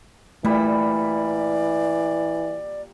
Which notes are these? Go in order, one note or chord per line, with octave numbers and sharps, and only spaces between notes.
A#2 E3 G3 A3 D5 B5